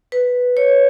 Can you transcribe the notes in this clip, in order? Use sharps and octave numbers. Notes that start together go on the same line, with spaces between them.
B4
C#5